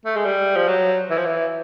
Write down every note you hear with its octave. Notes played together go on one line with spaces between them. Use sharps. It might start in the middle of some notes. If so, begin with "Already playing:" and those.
A3
G#3
G3
F3
F#3
E3
F3
E3